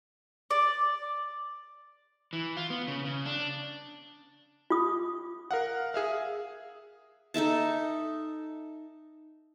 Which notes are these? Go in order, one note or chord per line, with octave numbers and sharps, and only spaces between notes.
D5
E3
F4
B3
C#3
C#3
D4
F4 D#6
A#4 F5 F#5
G#4 E5 F5
D#4 A4 E5 A5